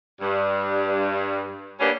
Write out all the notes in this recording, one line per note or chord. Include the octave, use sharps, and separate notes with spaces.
G2
G3 A#3 B3 C#4 D4 G4